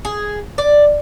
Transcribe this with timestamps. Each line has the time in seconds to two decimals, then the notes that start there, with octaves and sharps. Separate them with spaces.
0.05 G#4
0.58 D5